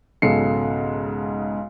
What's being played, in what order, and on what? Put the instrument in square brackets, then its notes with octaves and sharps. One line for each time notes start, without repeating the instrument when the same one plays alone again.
[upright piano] B1 G#2 C#3 A4 C7 C#7